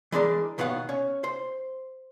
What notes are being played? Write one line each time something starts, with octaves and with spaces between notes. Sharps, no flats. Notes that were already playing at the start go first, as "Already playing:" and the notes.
E3 G#3 D4 A#4
D#2 B2 B3 C#5 F5 F#5
C#4 C#5
C5